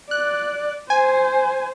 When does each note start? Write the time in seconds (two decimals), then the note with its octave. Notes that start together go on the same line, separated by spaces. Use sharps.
0.11 D5 F#6
0.90 C5 G#5